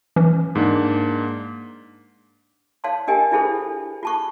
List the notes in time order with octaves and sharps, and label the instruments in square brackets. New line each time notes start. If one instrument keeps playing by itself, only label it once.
[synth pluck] E3 C#4
[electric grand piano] G#2 A#3 D4
[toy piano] C#5 F5 A5 C6
D4 G4 A#4 D#5 G5 G#5
D4 E4 F4 G#4 A4 C5
F4 A5 C#6